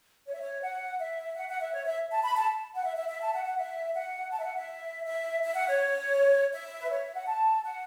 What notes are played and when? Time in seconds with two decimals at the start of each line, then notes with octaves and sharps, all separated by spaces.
0.26 C#5
0.33 E5
0.41 C#5
0.62 F#5
0.99 E5
1.36 F#5
1.49 F#5
1.61 E5
1.73 C#5
1.85 E5
2.11 A5
2.23 B5
2.36 A5
2.75 F#5
2.84 E5
2.97 E5
3.09 E5
3.21 A5
3.33 F#5
3.45 F#5
3.57 E5
3.94 F#5
4.32 A5
4.39 E5
4.44 F#5
4.57 E5
5.05 E5
5.43 E5
5.55 F#5
5.68 C#5
6.53 E5
6.80 B4
6.90 C#5
7.03 E5
7.15 F#5
7.27 A5
7.64 F#5